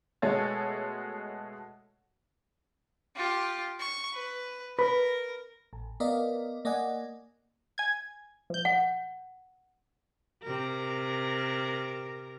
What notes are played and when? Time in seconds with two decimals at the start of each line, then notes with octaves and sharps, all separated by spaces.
0.22 B2 G#3 A3 A4 C#5 A6
3.16 F4 G4
3.79 C#6
4.13 B4
4.79 A#4 B4
5.73 A1
6.00 B3 A#4 D5 D#5 F5
6.65 A#3 D5 D#5 F#5 G#5
7.78 G#5 G#6
8.50 F3 G6
8.65 F#5
10.44 C3 A#4